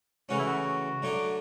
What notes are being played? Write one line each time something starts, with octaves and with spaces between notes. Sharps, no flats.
C#3 E3 A3 C#4 F#4
E4
F#4
D3 F#3 A3 D4